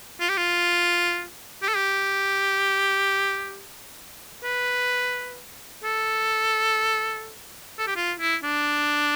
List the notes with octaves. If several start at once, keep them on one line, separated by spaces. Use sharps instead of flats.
F4
G4
F4
G4
A4
G4
B4
A4
A4
G4
F4
E4
D4